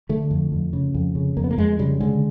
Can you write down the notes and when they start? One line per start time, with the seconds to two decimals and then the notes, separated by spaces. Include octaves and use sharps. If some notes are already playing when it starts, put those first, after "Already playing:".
0.09 D3 A3
0.31 F2
0.52 F2
0.73 C#3
0.94 F2
1.15 C#3
1.37 F2 A#3
1.44 B3
1.51 A#3
1.58 F2 G#3
1.79 C#3 G3
2.00 D3 G#3